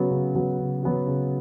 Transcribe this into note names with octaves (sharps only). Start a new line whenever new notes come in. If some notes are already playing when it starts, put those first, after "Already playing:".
Already playing: C#3 F#3 B3 F#4
C#3
F#3 B3 F#4
C#3
F#3 B3 F#4
C#3